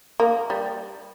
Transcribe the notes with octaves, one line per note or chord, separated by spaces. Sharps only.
A#3
G3